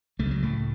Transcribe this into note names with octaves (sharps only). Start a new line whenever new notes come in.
C#2 C#3 A3
F#3
A2 A3